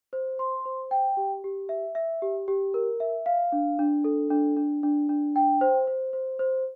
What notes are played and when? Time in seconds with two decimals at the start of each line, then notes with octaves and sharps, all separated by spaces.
0.13 C5
0.39 C6
0.65 C5
0.91 G5
1.17 G4
1.44 G4
1.69 E5
1.95 E5
2.22 G4
2.48 G4
2.74 A#4
3.00 E5
3.26 F5
3.52 D4
3.79 D4
4.04 A4
4.30 D4
4.57 D4
4.83 D4
5.09 D4
5.36 G5
5.61 C5
5.87 C5
6.13 C5
6.39 C5